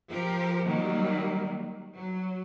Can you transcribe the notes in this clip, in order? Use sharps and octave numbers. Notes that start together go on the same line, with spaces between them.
F3 G4 A#4
D#3 F#3 G3 A#3
F#3